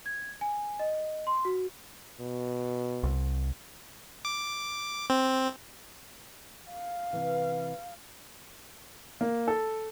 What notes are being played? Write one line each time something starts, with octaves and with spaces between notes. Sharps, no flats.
G#6
G#5
D#5
C6
F#4
B2
C2
D6
C4
F5
C3 E3
A#3
A4